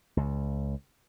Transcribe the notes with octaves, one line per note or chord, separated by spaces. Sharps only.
C#2